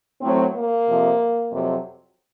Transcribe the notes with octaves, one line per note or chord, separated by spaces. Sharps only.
A2 F#3 C4
A#3
F2 C3 F3
F2 C3 F#3